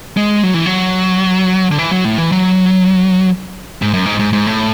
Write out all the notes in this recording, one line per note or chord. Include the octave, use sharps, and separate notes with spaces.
G#3
F#3
E3
F#3
D3
E3
F#3
A2
E3
F#3
G#2
F#2
G#2
G#2
G#2
A2